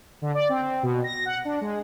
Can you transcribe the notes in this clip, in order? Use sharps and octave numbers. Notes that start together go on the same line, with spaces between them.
D3
D5
C4
C4
B2
A#6
F#5
D4
G#3